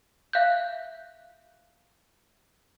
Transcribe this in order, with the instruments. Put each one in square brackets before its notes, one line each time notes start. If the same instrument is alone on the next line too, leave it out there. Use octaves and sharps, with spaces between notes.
[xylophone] E5 F5 F#6 G6